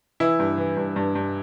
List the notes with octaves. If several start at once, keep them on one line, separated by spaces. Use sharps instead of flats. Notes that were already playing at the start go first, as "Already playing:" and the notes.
E3 E4
G2
E3
G2
G2
G2